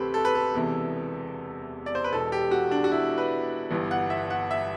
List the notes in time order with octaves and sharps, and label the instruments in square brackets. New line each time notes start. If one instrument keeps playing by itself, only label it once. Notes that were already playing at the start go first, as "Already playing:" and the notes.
Already playing: [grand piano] D2 C3 E3 C4 G4 A4 B4
A4
B4
A4
E1 E2 C3 E3
D5
C5
B4
E1 E2 B2 A4
G4
F#4
D4
F#4
E4
B4
G1 G2 E3
F#5
E5
F#5
E5